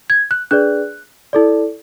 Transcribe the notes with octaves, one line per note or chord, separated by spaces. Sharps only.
G#6
F#6
D4 G#4 B4 D5 F#6
E4 A4 D5